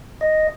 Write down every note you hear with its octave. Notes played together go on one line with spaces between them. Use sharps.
D#5